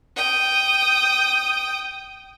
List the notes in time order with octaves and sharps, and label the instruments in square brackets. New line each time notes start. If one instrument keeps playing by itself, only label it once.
[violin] G5 D#6